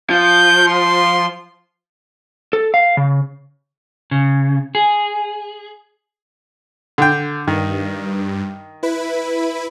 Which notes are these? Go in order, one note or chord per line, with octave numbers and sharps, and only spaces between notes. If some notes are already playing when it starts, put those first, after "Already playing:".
F3 G6
C6
A4
F5
C#3
C#3
G#4
D3 G5
G2 D#3
E4 B4 B5